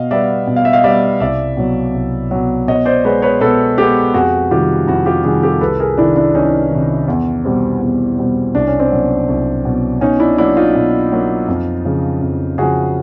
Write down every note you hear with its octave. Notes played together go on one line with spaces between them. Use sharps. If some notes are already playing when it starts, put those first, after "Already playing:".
Already playing: B2 D#5 F5
G3 B3 D5 E5
B2
F5
E5
D#5 F5
G3 B3 D5 E5
C2 D5 E5
B2 F#3
C2
B2 F#3
B2 C#5 D#5
C5 D5
G#3 B3 B4 C#5
B4 C#5
B2 A4 B4
G#3 B3 G4 A4
F2 F#4 G#4
C3 D#3 G3 F4 G4
F2 E4 F#4
F4 G4
C3 D#3 G3 F#4 G#4
G4 A4
C2 A4 B4
G#4 A#4
C3 D#3 D4 E4
D4 E4
C2 C#4 D#4
C3 D#3
E2
B2 G3 C4
E2
B2 G3 C4
C2 D4
C#4
C4 D4
B2 F#3
C2
B2 F#3
B2 C#4 D#4
D4 E4
F#3 A#3 D4 E4
D#4 F4
B2
F#3 A#3
F2
C#3 F3
F2
C#3 F3 F#4 G#4